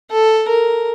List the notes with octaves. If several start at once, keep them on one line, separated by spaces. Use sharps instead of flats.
A4
A#4